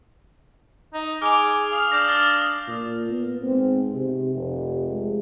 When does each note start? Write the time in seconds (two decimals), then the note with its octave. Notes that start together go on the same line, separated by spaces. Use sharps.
0.93 D#4
1.22 G#4 D6 F6 F7
1.73 F5 D#6
1.92 D4 E6 G6 A#6
2.08 F5 D#6 F6 A6
2.67 A#2
3.10 B3
3.42 G#2 C4
3.94 C3 G4
4.35 F1
4.87 G#3